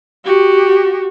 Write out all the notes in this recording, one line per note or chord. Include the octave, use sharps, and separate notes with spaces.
F#4 G4